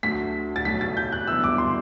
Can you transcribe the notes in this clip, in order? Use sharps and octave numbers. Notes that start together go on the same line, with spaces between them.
D2 D3 F#3 A3 B6
A6
B1 B2 F#3 A3 B6
A6
G6
F#6
G1 F#2 E3 B3 E4 E6
D6
C6